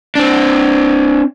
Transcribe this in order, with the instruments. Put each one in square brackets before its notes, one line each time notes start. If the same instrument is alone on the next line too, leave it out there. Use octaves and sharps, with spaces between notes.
[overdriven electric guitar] C4 D4